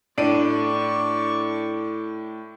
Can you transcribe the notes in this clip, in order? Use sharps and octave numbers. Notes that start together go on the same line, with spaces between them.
A2 D4 D5 C#6 D7 D#7